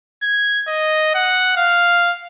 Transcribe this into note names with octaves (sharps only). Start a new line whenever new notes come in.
G#6
D#5
F#5
F5